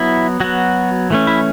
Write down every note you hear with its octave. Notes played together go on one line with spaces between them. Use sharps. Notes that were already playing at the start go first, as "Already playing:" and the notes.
Already playing: F#3 B3 E4
F#3 B3 F#4
E3 A3 C#4
E4